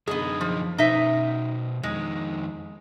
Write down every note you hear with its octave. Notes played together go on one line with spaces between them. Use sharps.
F#2 D3 B3 D#4 G#4
F3
B2 D#4 C5 E5
F2 D#3 G#3